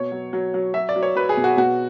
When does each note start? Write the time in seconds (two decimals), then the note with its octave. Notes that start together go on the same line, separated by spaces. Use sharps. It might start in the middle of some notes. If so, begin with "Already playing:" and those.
Already playing: B2 C#5
0.12 F#3
0.33 F#3
0.54 F#3
0.74 F#3 E5
0.89 D5
0.96 F#3
1.03 C#5
1.16 F#3 B4
1.29 G#4
1.37 B2
1.44 F#4
1.57 B2 F#4